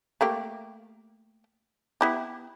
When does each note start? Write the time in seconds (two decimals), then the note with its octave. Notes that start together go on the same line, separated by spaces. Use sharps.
0.21 A3 A#3 G4
2.01 B3 E4 G4